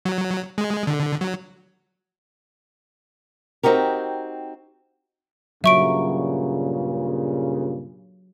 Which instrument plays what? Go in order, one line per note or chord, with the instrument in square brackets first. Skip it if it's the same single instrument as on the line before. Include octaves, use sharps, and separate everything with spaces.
[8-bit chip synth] F#3
G#3
D3
F#3
[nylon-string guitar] C4 D#4 F#4 G4 A#4
[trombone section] G2 A#2 C#3 [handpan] F#3 [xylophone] E5 C#6 D7